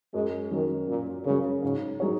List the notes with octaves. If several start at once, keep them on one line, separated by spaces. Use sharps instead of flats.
F#2 G#3
D#3 F#3 C#4 A#4
F#2 A#2
C#3 F#3 C#4 A#4
G#2 C#3
F#3 D#4 G#4 C#5